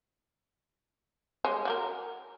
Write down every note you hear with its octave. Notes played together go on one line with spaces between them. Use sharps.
G3 G#3 C#5
F#4 G4 A#4